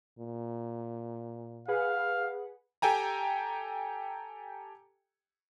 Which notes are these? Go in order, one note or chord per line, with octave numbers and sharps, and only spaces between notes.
A#2
G#4 B4 F5 F#5
G4 A4 G5 G#5 A#5